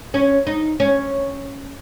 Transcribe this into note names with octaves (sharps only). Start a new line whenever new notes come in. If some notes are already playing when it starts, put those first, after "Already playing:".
C#4
D#4
C#4